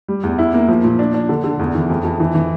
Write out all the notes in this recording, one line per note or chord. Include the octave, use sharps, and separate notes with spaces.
G3
E2
E4
A#3
F3
A#2
D4
D4
D3
D3
E2
E3
F2
F2
E3
E3